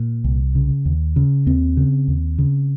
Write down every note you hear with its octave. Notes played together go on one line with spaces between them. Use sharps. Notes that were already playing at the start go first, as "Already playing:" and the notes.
Already playing: A#2
C2
C#3
D#2
C#3
D#2 C4
C#3
D#2
C#3